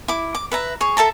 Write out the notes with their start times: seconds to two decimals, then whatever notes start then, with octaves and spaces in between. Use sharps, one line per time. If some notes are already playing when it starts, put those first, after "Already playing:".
0.08 E4 D6
0.35 D6
0.52 B4 E5 A#5
0.81 G#4 C#5
0.97 A4 E5 A5 A#5